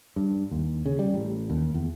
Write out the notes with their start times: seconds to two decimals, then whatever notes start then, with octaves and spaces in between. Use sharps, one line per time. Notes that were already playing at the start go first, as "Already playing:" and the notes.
0.16 G2
0.51 D#2
0.86 C#3
0.99 G3
1.14 A1
1.50 D#2
1.74 E2